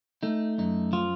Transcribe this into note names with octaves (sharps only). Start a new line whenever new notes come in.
A3 D#4
F#2 D#4
F3 F4